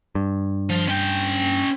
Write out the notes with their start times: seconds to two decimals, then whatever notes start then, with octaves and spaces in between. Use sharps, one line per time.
0.15 G2
0.70 F3
0.89 C#4 G5